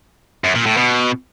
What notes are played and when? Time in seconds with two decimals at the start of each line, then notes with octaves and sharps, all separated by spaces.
0.44 F#2
0.55 A#2
0.66 A2
0.77 B2